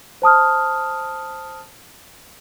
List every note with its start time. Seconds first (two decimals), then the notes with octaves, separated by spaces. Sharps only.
0.22 C5 A5 D#6 F6